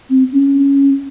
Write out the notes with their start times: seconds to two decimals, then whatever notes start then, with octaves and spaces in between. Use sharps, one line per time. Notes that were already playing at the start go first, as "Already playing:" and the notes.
0.10 C4
0.32 C#4